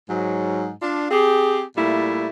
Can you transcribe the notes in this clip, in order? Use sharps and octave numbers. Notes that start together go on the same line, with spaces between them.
G#2 F#3
D4 F4
C4 G4 G#4
A#2 G3 A3 E4